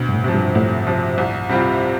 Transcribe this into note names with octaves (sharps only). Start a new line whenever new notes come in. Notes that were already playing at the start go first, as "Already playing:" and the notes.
Already playing: D2 B2
G2
A2
C3 F3
G2
D2 A2
C3 F3
C2
C3 G3 C4 F4